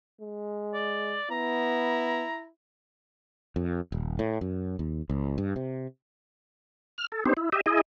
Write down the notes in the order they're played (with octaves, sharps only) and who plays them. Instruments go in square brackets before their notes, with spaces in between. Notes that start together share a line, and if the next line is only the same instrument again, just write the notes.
[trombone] G#3
[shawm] D5
[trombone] B3 [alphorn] E4 [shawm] A#5
[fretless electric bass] F2
D#1
A2
F#2
D#2
C#2
G2
C3
[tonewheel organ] F6
A4
B3 C4 D4 D#4 G4 C5
E4
G4 D#5 E5
E4 G#4 D#5